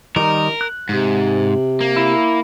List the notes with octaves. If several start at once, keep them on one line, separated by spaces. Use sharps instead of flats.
D#3 G3 D#4 A#4
F#6
G#2 C3
A#3
E4